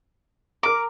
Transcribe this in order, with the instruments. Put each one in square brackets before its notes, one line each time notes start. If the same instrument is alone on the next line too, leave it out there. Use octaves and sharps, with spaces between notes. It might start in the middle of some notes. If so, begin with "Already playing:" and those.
[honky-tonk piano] A#4 A#5 [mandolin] D6